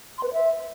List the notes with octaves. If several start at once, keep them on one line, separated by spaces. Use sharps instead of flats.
C6
B4
C5
E5